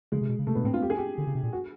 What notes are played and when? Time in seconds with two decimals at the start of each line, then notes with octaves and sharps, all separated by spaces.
0.12 C#3 G#3
0.21 C3
0.29 B2
0.39 C#3
0.47 C3 A3
0.55 B2 B3
0.64 A2 C4
0.74 F4
0.82 G4
0.90 G#4
0.97 G4
1.18 D3
1.27 C#3
1.35 C3
1.43 A#2
1.53 F#4